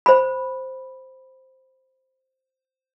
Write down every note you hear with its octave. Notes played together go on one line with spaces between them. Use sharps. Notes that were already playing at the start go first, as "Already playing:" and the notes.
C5 B5